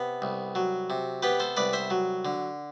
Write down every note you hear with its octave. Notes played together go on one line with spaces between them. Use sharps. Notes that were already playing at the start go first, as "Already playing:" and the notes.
Already playing: C3 B3
C2
F#3
C3
B3 G4 B4
A4 C5
C2 B4 D5
C5 E5
F#3
D3